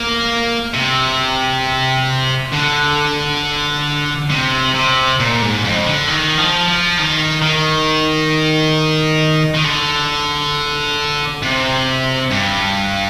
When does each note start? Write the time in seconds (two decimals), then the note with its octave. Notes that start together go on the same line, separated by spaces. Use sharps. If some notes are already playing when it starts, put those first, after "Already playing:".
Already playing: A#3
0.74 C3
2.52 D3
4.30 C3
4.75 C3
5.20 A#2
5.42 G#2
5.64 F2
5.86 D3
6.08 D#3
6.38 F3
6.68 F3
6.98 D#3
7.42 D#3
9.54 D#3
9.64 D3
11.42 C3
12.31 G2